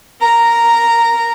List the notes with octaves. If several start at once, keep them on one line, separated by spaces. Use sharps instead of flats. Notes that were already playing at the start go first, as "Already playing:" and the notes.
A#4 A#5